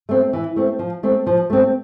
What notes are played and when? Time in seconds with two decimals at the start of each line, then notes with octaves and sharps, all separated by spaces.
0.09 A3 C4
0.33 E3
0.56 A3 C4
0.79 F3
1.03 A3 C4
1.27 F3
1.50 A3 C4